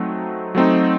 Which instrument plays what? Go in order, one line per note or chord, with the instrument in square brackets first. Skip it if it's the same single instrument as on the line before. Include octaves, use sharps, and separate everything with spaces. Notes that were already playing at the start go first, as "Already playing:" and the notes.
Already playing: [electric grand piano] F#3 A3 C4 D#4
F#3 A3 C4 D#4